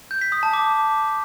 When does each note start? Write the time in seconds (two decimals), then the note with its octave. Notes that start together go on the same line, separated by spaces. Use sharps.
0.11 G6
0.21 B6
0.32 D#6
0.43 A5
0.54 D6